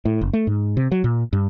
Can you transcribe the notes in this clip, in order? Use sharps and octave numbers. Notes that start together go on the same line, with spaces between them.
A2
F#1
A3
G#2
C3
F#3
A#2
G2